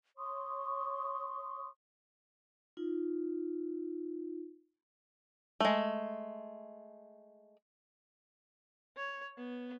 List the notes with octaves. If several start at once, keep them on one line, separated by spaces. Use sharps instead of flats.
C#5 C6 C#6 D#6
D#4 F4
G#3 A3
C#5
B3